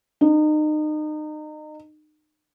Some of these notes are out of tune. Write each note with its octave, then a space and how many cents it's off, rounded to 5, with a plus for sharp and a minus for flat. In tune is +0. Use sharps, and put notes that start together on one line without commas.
D#4 -30